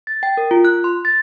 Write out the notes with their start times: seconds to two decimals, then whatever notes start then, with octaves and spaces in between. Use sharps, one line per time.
0.07 A6
0.23 G5
0.37 A#4
0.51 F4
0.65 F#6
0.84 C6
1.05 A6